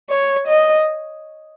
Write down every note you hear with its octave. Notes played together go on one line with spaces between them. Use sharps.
C#5
D#5